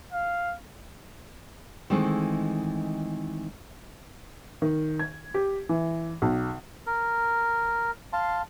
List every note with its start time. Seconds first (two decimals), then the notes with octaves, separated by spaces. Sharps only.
0.12 F5
1.90 D#3 E3 G#3 A3 C4
4.62 D#3
4.99 G#6
5.34 G4
5.69 E3
6.22 B1
6.87 A#4
8.13 F5 A5 C6